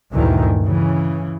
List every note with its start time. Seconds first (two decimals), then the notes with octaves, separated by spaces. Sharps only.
0.12 G1 D2 G2 A#2 D#3 E3
0.63 C#3 E3